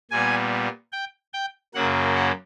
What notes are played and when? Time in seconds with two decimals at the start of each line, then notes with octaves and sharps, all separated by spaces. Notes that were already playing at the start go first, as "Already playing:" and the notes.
0.11 A#2 G3 B3 G#5
0.92 G5
1.34 G5
1.74 F#2 C#3 F#3 A#3 F#5
2.15 F#5